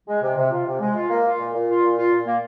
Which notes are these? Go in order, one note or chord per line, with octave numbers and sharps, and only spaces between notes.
G#3
C3
C3
F4
C3
G#3
F4
A#3
F4
A#2
A#2
F4
A#2
F4
A#2
A#3